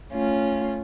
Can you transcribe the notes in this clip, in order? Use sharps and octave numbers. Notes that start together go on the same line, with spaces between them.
A3 C#4 F4